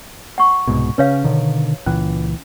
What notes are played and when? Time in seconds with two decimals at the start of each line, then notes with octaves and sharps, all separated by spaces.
0.38 F#5 C#6
0.68 C2 G#2 B2
0.98 C#3 C#4 B4 C#5 F5
1.24 B2 D3 D#3
1.86 C#2 A#2 E3 C#4